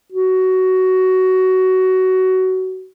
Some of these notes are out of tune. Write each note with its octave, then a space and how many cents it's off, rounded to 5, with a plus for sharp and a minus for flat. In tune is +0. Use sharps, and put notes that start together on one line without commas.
F#4 +15